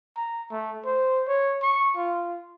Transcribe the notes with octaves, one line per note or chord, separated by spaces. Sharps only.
A#5
A3
C5
C#5
C#6
F4